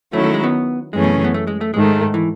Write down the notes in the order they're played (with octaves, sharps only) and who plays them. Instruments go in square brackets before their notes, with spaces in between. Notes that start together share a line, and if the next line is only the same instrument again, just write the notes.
[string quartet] D#3 F#3 C#4 E4 [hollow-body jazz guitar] A3
[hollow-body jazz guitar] A3
G#3
B3
[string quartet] F#2 E3 A3 C#4 G#4 [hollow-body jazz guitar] G#3
[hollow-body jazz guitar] B2
C#3
B3
A3
G#3
A3
[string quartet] G#2 D#3 A3 [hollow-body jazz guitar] G#3
[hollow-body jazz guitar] E3